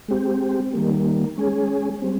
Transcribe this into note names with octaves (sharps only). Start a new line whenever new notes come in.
G#3 C4 G4
D#3 G3 A#3
G#3 C#4 G#4
G3 C4